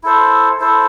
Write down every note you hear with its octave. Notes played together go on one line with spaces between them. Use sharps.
E4 A4 C5
E4 A4 C5